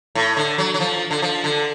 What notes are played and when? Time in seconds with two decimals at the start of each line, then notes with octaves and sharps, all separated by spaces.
0.15 A2
0.37 D3
0.58 F#3
0.74 F#3
0.80 F3
1.11 D3
1.22 F3
1.44 D3